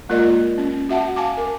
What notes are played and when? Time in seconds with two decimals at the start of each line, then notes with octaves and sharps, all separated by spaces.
0.09 G#3 A#3 F4 A#4 D5 D#5
0.58 C#4
0.89 F#4 E5 F#5 A5
1.16 F5 G#5 A5 D6
1.37 A#4